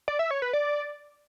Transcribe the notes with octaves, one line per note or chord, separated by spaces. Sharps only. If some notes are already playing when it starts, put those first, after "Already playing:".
D5
E5
C#5
B4
D5